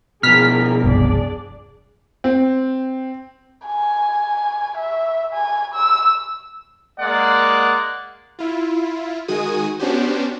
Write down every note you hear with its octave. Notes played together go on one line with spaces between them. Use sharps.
B2 F3 E4 G#4 A#4 F6 B6
E1 C2 G2 D4 G#4 D5
C4
G#5
E5
G#5
E6
G#3 A#3 D5 F#5
E4 F4
D#3 G#3 F#4 G#5 D#6 D#7
B3 C#4 D4 F#4 G4 C5